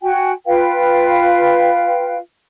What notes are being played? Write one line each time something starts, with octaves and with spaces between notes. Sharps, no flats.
F#4 G5 G#5
F4 B4 F5 G5